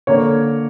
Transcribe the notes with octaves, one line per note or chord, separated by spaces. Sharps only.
D3 A#3 C#5